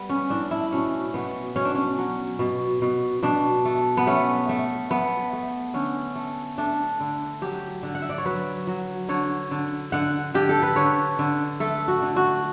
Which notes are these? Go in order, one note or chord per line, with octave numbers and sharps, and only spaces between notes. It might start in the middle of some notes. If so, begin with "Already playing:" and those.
Already playing: G3 B3
C#4
A2 D4
E4
B2 C#4
B2 B3
B2 C#4
D4
C#4
F#3
B2
B2
B2 D4
A3
B3
A3 C#4
A3
A3 B3
A3
D3 C#4
A3
A3 D4
D3
F#3 G4
D3
F#5
E5
D5
C#5
F#3 B4
F#3
D3 C#5
D3
D3 F#5
D3 G4
A4
B4
D3 C#5
D3
A3 A4
F#4
D3
F#4